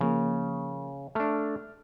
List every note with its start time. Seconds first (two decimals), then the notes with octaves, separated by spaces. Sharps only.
0.01 C#3 F3 A#3
1.15 A3 D4 F6